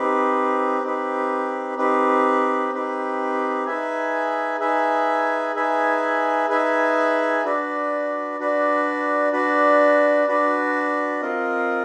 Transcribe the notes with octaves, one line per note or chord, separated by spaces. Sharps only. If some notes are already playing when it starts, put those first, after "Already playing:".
Already playing: C4 D#4 G4 B4
C4 D#4 G4 B4
C4 D#4 G4 B4
C4 D#4 G4 B4
D#4 G#4 B4 E5 G#5
D#4 G#4 B4 E5 G#5
D#4 G#4 B4 E5 G#5
D#4 G#4 B4 E5 G#5
D4 F#4 B4 D5
D4 F#4 B4 D5
D4 F#4 B4 D5
D4 F#4 B4 D5
C4 F4 A#4 D#5